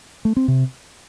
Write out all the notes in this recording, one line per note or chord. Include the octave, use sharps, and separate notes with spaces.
A3
C4
C3